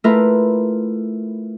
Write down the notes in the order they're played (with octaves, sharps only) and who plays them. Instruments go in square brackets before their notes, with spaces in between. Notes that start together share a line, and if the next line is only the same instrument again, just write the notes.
[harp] A3 E4 F4 A#4 B4